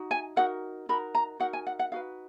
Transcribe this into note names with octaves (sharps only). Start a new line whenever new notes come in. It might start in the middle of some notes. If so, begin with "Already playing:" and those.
Already playing: D#4 F#4
G#5
D#4 F#4 A#4 F#5
D#4 F#4 A#4 B5
A#5
D#4 F#4 A#4 F#5
G#5
F#5
F#5
D#4 F#4 B4 F5